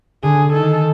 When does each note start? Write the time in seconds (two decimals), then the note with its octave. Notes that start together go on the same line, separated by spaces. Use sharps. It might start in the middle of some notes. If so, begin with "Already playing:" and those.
0.23 D3 G#4
0.53 D#3 A4